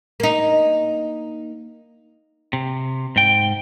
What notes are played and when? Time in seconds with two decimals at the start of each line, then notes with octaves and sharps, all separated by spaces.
0.20 A#3 D#4
2.53 C3
3.16 G#2 G5